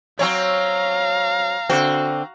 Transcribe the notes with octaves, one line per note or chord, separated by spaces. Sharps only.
F#3 C4 C#5 F5 A#5
D3 C4 F#4